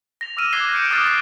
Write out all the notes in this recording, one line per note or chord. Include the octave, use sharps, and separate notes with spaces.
A#6 F7
D6 E6 F6 D#7 E7
D6 F#6 G#6 A#6 C7 G7
G6 C#7 D7 E7
D6 D#6 F6 F#6 A6 E7
C#6 D#6 F6 C7 D7